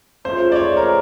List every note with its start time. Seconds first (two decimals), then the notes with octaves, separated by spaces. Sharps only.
0.25 C#3 F3 A3 C5
0.52 D5
0.56 C#5
0.77 A#4